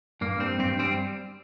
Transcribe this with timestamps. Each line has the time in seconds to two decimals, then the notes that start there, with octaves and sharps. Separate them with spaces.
0.21 G2 A#3
0.40 G3 C4
0.59 G2 C4
0.79 G3 C4